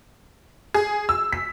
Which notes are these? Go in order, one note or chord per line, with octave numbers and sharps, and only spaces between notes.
G#4
E6
B6